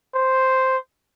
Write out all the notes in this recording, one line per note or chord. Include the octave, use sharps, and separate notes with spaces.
C5